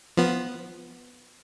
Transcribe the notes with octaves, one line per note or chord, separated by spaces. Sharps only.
F3 B3